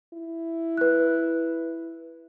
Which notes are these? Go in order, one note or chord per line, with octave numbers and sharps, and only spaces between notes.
E4
B4 F#6